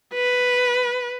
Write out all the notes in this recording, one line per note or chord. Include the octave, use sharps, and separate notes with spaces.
B4